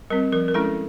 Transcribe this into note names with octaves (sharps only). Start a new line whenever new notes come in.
G3 C4 A#4
F3 A#4
A#4
G#3 C#4 E4 A4